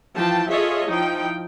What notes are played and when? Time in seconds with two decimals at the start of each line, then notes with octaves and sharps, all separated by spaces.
0.15 E3 F3 G5 A5
0.49 F4 G#4 A4 C#5 D#5 E5
0.87 F3 D#4 E4 G5